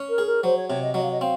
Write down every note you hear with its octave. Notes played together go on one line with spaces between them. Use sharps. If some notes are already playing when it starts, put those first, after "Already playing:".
Already playing: C#4
A#4
G#4
A#4
F#3 C5
C#5
C3 C#5
D#5
F#3 D#5
F5
D#5
C4 F5